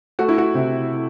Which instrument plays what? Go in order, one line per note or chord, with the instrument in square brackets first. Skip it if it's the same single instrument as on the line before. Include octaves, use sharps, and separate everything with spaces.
[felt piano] A3 F#4
E4
F#4
C3